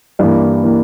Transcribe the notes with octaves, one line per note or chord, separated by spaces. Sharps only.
G2 E3 A#3
E3 A#3